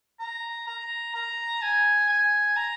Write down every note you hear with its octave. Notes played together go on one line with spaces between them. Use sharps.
A#5
A#5
A#5
G#5
G#5
A#5